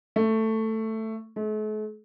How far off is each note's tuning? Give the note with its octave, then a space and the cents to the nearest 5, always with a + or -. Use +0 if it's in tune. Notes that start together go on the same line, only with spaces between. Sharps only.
A3 +10
A3 -45